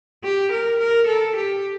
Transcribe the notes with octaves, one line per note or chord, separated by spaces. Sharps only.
G4
A#4
A#4
A4
G4